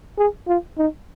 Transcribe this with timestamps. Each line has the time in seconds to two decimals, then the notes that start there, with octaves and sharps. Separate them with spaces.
0.18 G#4
0.48 F4
0.78 D#4